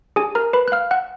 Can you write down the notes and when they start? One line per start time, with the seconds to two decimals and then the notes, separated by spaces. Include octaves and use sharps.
0.16 D4 G4 G#4 G#5
0.35 A#4 A#5
0.53 B4 B5
0.68 F#6
0.72 F5 F6
0.91 F#5 F#6